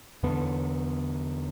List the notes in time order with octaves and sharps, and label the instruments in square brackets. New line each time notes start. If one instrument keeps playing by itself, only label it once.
[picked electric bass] E2 D3 B3